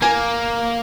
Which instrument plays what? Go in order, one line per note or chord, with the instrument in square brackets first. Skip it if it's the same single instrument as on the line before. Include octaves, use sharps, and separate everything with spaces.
[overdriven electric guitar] A#3 [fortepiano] G#5